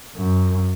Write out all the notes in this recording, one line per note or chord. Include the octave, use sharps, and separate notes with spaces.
F#2